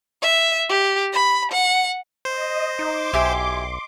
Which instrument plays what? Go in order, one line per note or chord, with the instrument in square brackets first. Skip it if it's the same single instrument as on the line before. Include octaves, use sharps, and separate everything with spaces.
[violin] E5
G4
B5
F#5
[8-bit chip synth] C5 [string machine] D#5
[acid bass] D#4 [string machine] C6 D6
[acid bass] B1 [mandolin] E4 G4 G#5